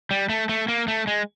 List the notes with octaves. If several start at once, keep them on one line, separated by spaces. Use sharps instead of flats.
G3
A3
A3
A#3
A3
G#3